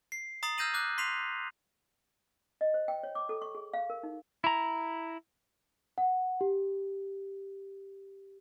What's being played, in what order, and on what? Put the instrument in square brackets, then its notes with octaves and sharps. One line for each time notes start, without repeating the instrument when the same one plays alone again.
[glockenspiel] C7
A#5 D#6 A6 C7 F#7
E6 F6 G6 A#6 D#7 F#7
D6 F6 F#6
C6 B6 C7 D#7 F7
[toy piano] D#5
C5
G5
C#5
D6
A4
C#6
G#4
F5
A#4
D#4
[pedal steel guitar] E4 A#5
[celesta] F#5
G4